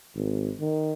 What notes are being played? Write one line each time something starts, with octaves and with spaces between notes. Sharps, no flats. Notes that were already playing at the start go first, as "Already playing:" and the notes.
G#1
D#3